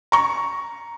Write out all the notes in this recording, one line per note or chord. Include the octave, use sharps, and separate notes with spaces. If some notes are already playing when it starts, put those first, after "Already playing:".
A#5 C#6